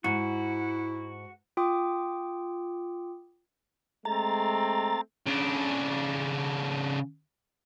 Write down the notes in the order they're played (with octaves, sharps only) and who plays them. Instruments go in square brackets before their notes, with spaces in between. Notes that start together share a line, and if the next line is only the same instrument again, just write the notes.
[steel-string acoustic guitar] G#2 [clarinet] E4 [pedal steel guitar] F#4
[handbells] F4 G5 D6 D#6
[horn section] G#3 A3 C4 [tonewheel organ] A#5 A6
[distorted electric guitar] C#3 D4